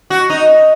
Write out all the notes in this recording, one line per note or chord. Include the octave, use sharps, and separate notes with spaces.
F#4
D#4